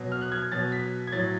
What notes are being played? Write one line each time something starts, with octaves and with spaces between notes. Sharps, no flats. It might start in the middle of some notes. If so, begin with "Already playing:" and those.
Already playing: B2 F#3
F6
F#6
G#6
B2 F#3 A6
B6
G#6
A2 F#3 A6